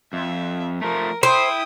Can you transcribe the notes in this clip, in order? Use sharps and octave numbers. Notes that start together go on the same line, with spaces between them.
F2 E5
F3 A3 A#4
E4 C5 G5 D#6